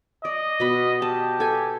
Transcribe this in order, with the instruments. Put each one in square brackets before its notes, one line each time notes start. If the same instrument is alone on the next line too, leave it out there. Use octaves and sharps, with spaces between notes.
[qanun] D5 [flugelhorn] D#5
[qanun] B2 B5
[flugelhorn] G4 [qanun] A5
[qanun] A4 G#5